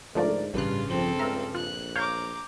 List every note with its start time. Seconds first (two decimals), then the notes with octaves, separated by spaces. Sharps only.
0.15 G#2 D3 F3 A3 D4 A#4 D5
0.54 A1 G2 C#3 G3 F4 F#6
0.89 F3 C4 A4
1.19 C#2 E5 A#5 F6
1.55 A#1 F4 F#6
1.96 C#5 F5 A#5 D6 G6